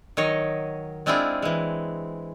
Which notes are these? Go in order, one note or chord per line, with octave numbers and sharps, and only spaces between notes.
D#3 F#3 C#5 D#5
G#3 C4 D4 E4 F4 G#4
E3 G#3